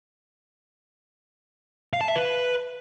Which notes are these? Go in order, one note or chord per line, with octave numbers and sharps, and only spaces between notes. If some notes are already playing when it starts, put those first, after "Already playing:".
F5
A5
E5
B4